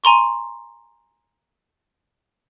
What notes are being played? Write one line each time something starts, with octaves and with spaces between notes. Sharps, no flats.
G#5 A#5 C6 C#6